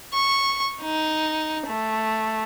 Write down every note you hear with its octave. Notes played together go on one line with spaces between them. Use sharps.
C#6
D#4
A3